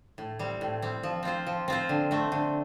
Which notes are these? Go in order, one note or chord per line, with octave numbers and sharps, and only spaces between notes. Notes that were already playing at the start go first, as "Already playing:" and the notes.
A2
G3 C4
A2
G3 C4
F3
C4 F4 C5
F3
C4 F4 C5
D3
A3 C4
D3